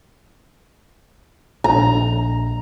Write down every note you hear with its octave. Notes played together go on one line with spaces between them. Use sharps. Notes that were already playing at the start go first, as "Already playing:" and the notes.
A#1 D4 A#5